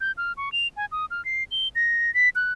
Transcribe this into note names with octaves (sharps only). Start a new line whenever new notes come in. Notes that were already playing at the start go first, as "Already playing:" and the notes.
G6
F6
C#6
F7
G#5
D#6
F6
C7
G7
A#6
B6
F#6